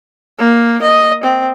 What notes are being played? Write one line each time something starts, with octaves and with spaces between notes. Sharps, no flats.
A#3
D#5
C4